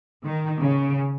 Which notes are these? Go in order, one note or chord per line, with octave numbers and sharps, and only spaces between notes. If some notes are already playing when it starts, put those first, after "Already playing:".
D#3
C#3